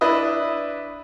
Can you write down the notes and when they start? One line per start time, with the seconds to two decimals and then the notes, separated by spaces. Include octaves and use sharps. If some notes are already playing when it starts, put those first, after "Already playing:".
0.01 D4 E4 B4 D#5